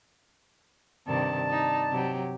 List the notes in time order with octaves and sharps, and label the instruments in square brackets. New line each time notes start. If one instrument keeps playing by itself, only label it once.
[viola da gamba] G2 C3 D#3 [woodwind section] D5 A5
[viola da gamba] D#4
C3 F#3 G4